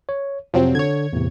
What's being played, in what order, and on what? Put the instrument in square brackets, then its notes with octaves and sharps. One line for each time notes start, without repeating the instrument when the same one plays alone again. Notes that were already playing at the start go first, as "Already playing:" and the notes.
[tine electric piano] C#5
[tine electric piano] F2 C3 [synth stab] F3 F#3 C4
[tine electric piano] D3 [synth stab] C#5 G#6
[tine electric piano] E2 A2 C3